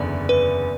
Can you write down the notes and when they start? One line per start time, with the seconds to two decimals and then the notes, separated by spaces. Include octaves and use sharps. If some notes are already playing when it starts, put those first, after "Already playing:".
Already playing: F#1 E2 D3 D5
0.29 B4